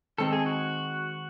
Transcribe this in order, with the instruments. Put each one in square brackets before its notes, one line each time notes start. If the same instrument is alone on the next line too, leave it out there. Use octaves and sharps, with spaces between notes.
[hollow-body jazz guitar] D#3 G#3 C4 D#4 [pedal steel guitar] A4
[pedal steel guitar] G#4
F#4